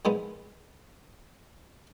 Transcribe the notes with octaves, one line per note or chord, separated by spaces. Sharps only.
A#2 F3 G#3 B3 D#4